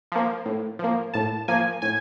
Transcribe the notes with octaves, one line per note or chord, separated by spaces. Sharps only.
F3 A#3
A2
F3 A#3
A2 A5
F3 A#3 G#5
A2 G#5